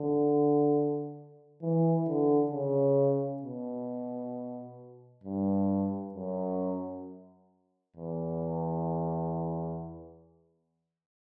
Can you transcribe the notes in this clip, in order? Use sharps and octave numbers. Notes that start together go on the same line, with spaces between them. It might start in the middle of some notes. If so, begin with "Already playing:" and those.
Already playing: D3
E3
D3
C#3
B2
G2
F#2
E2